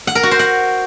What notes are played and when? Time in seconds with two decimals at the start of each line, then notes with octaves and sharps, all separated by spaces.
0.07 F#5
0.15 A#4
0.23 F#4
0.31 C5
0.39 F#5